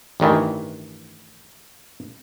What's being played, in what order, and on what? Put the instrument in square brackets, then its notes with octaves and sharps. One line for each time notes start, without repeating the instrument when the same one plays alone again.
[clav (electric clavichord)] A1 G2 D#3 E3